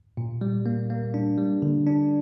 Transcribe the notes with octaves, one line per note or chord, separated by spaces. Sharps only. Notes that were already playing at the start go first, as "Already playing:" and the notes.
A#2
G3
A#3
A#3
D4
G3
D3
D4